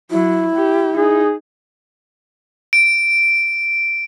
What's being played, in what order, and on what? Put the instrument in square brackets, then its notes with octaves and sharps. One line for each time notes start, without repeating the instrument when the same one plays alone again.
[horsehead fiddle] F#3 [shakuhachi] E4
[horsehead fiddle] G4
[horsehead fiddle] D#4 [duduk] G#4
[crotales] D7